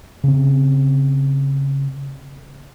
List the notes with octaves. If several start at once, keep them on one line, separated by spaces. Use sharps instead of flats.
C#3 C4